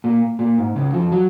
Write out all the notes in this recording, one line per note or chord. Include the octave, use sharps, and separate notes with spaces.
A#2
A#2
G#2
C#2 C#3
F2 F3
F#3